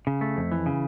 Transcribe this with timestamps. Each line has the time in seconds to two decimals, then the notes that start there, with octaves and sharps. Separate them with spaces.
0.07 C#3
0.21 A3
0.37 F2
0.52 E3
0.66 C#3